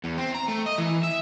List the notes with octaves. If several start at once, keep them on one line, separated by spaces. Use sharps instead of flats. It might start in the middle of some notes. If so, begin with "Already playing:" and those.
E2
C4
A#5
A3
D#5
E3
E5